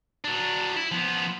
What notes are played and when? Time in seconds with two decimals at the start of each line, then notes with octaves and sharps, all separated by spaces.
0.24 F#3 D4
0.76 E4
0.91 F3 B3